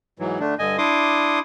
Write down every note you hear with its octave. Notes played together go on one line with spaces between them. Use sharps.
G#2 E3 F#3
D3 A3 D4
G2 D3 D#5 G#5
D4 E4 C6 D6 D#6